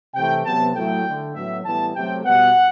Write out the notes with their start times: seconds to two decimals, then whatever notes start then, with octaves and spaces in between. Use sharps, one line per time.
0.14 C3 E3 A3 G5
0.45 C3 F#3 B3 A5
0.74 A2 F#3 A3 G5
1.05 D3 A3
1.34 A2 F#3 B3 E5
1.65 A2 E3 G3 B3 A5
1.95 C3 F#3 A3 G5
2.25 B2 G3 B3 F#5